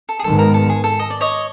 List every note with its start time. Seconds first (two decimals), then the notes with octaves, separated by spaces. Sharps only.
0.09 A4
0.19 G#4
0.24 G#2 D#3 G#3 B3 A4
0.39 A#4
0.54 A4
0.69 G#4
0.84 A4
0.99 D#5
1.10 D5
1.21 C#5 D#5